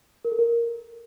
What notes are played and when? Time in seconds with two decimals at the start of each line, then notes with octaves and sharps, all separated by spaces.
0.25 A#4
0.32 A4
0.39 A#4